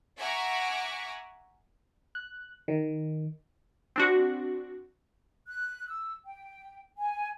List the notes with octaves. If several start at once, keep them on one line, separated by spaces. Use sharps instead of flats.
E5 F#5 G#5 A#5 C#6 D6
F#6
D#3
C4 D4 F#4
F#6
E6
G5
G#5